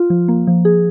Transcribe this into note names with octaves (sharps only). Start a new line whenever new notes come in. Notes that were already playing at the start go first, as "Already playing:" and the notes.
Already playing: F4
F3
A#3
F3
G#4